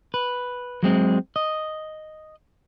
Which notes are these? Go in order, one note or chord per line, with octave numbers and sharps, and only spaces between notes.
B4
F#3 G#3 C4
D#5